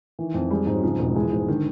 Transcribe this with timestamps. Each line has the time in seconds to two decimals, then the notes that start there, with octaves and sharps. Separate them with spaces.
0.19 D#3 E3
0.34 F2
0.51 G3 G#3
0.67 G#2
0.74 F#3
0.83 C#3 F3
0.99 E1
1.15 E3 G#3
1.32 G#2
1.48 D3 D#3